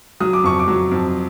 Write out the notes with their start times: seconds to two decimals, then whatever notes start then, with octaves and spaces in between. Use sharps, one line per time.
0.20 F#3 D#6
0.33 D6
0.44 F2 C#6
0.59 D6
0.68 F#3
0.91 F2